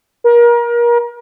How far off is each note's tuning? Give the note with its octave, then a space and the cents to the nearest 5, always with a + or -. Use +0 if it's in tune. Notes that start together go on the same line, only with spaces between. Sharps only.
A#4 +30